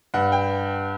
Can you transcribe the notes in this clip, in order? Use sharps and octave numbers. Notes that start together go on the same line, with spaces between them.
G2 F#5
G5